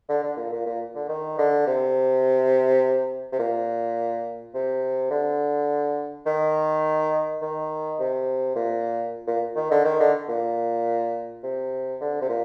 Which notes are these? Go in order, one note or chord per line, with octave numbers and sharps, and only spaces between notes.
D3
D3
A#2
A#2
A#2
D3
D#3
D3
C3
C3
A#2
C3
D3
D#3
D#3
C3
A#2
A#2
D#3
D3
D#3
D3
A#2
C3
D3
C3
A#2